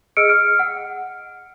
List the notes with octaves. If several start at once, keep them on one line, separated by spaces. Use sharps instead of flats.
G#4 D#5 E6 F6 C#7 D7
F6
F#5